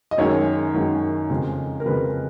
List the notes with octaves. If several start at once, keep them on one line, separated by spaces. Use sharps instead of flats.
D#5
F#2 D#3 G#3 C#5
F#2 D#3 G#3
F2 C#3 G#3
A#4
F2 C#3 G#3 B4